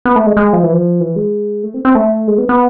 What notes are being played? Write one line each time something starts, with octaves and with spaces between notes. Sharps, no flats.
B3
A3
G#3
G#3
F3
E3
F3
E3
G#3
A3
C4
C4
A3
G#3
B3
B3